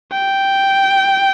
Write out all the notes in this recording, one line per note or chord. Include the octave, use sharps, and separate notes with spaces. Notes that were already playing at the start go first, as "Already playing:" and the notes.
G5